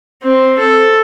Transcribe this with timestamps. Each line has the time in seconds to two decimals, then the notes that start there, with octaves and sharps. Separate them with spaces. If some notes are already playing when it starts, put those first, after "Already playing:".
0.23 C4
0.58 A4